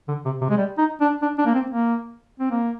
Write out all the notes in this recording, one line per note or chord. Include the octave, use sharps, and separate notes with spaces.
D3
C3
C3
G#3
G3
D#4
D4
D4
D4
A#3
C4
A#3
C4
A#3